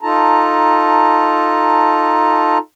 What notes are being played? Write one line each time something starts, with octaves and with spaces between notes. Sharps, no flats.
D#4 F4 A4 A5 A#5